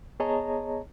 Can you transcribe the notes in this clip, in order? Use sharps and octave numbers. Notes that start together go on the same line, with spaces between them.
B3 G#4 C#5 D#5 A5 A#5